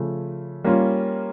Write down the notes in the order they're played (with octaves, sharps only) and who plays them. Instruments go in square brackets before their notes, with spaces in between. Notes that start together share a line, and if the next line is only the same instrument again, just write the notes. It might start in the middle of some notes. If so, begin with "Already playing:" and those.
Already playing: [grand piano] C#3 F3 A3
G3 A#3 C#4 F4